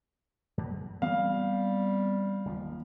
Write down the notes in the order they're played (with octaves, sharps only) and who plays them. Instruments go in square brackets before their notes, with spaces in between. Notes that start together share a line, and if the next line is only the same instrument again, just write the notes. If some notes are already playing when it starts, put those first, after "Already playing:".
[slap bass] F#2
[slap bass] E3 B3 C4 [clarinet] G3 [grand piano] F5
[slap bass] F#1 D#2 F3